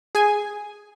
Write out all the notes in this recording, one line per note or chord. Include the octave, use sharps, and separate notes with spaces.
G#4 G#5